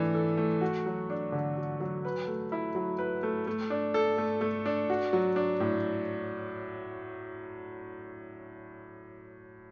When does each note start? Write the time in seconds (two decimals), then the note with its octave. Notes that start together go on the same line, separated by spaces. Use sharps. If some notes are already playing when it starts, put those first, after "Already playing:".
Already playing: E3 A3 D4
0.14 A4
0.37 A3
0.61 F#4
0.86 F#3
1.10 D4
1.32 D3
1.57 F#4
1.80 F#3
2.05 B4
2.27 A3
2.52 E4
2.75 F#3
2.98 B4
3.23 A3
3.47 A3
3.70 D4
3.94 A4
4.18 A3
4.41 A3
4.66 D4
4.90 F#4
5.13 F#3
5.36 D4
5.60 A2